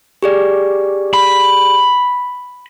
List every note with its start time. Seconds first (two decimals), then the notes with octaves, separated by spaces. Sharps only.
0.23 G4 G#4 D5
1.14 B5